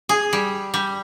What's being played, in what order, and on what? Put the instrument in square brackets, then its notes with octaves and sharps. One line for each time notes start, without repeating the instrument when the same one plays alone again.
[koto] G#4
G3
G3